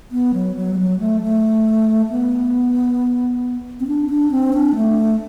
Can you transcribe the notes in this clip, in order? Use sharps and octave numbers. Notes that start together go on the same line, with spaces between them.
B3
F#3
F#3
G3
F#3
A3
A3
B3
C4
D4
D4
C4
D4
A3